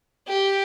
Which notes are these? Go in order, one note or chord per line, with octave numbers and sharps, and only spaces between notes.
G4